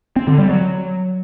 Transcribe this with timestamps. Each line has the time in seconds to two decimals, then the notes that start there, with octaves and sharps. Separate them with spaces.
0.16 C4
0.27 D3
0.38 G3
0.49 F#3